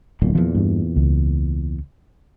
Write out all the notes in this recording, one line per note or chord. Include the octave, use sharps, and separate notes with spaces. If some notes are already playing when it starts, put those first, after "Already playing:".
D1 B1 A#2
E2 A#2 F3
G2
C#2